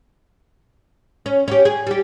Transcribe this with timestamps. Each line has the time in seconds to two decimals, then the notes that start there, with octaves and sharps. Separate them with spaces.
1.26 C#4
1.48 C#4 G4
1.65 G#4
1.87 G3 G4